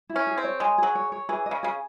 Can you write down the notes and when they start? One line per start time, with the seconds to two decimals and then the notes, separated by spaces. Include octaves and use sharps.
0.09 E4
0.16 C#4
0.27 G#4
0.37 C4
0.44 C#5
0.60 G#3 G#5
0.78 F#3 G#4
0.95 C#5
1.12 C#5
1.29 E3 G#4
1.46 D#5
1.51 C#3
1.63 C#3 G#4